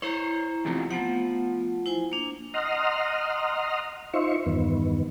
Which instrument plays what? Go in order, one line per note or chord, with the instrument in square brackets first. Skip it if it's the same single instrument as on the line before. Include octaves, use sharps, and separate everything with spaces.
[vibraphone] E4 A#5 [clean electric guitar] C5 C#5
[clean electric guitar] E2 C3 F3
[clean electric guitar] F3 [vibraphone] A3 B3 F#5
[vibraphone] E4 C5 G#5
A#3 D4
[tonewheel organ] D#5 F#5 A#5 C6 D#6 F6
D#4 F4 C5 E5 C#6
E2 G2 D#3 B3